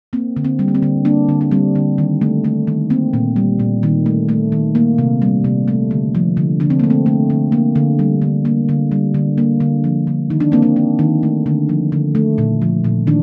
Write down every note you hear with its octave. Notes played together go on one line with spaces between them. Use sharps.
A#3 C4
D3
C4
G3
A#3
C4
D3
A#3 D4
D3
D4
G3 C4
D3
D#3
A3
A3
D#3
A#3 C4
A#2
G3
A#2
D#3
A3
A3
D#3
A#3
C3
G3
C3
A3
D3
F3
D3
D3 D4
C4
A3 A#3
C4
A3
D3
A#3
D3
G3
D3
A#3
D3
G3
D3
A#3
D3
F3
D3
D#3 D#4
D4
A#3 C4
D4
A#3
D#3
A3
D3
F3
D3
A3
A#2
F3
A#2
D#3 D4